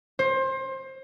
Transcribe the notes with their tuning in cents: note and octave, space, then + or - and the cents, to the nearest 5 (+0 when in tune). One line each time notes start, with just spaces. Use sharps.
C5 +25